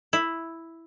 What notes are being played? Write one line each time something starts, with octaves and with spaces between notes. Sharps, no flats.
E4